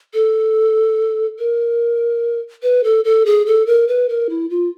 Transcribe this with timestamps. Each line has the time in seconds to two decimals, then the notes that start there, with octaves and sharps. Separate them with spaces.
0.14 A4
1.39 A#4
2.63 B4
2.84 A4
3.05 A4
3.26 G#4
3.46 A4
3.67 A#4
3.88 B4
4.09 A#4
4.30 E4
4.50 F4